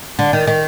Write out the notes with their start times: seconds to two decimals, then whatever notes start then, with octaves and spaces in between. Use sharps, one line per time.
0.19 D3
0.33 D#3
0.47 D#3